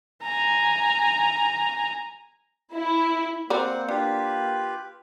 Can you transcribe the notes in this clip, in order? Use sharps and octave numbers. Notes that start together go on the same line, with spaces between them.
G#5 A#5
E4
A#3 C4 A#4 C5 D5 F#5
D4 F4 G4 B4